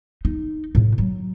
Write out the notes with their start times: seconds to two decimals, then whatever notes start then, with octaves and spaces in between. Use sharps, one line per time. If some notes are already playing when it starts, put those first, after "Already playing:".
0.25 D#4
0.75 A2 C3
0.98 F#3